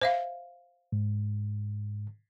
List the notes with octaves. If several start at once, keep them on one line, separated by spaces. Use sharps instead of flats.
C5 E5 F5
G#2